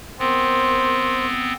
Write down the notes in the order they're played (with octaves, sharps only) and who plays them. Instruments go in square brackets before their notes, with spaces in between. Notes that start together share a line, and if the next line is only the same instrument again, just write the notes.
[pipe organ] B3 C4 [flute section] A#4 C5 C6